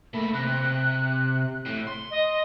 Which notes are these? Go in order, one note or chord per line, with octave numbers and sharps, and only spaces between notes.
A3 A#3 B5
C3 F#6
A2
C6
D#5